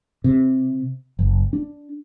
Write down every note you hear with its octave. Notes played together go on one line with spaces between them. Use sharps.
C3
F#1
D4